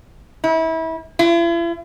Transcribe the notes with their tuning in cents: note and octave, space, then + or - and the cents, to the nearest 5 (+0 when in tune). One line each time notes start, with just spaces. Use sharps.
E4 -30
E4 +45